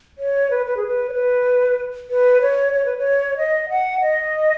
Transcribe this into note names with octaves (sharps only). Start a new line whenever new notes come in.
C#5
B4
B4
G#4
B4
C#5
B4
B4
C#5
C#5
B4
C#5
D#5
F#5
D#5